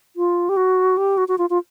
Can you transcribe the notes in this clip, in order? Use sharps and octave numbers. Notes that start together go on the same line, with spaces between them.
F4
G4
F#4
G4
F#4
F#4
F4
F4